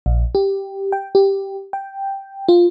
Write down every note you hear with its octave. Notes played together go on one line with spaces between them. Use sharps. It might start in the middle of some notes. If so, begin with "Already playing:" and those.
A#1
G4
G5
G4
G5
F4